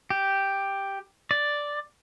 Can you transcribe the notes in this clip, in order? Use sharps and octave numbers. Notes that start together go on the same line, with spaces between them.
G4
D5